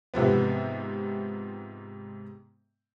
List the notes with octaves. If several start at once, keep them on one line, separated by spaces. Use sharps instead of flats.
G#2 C3 F3 B3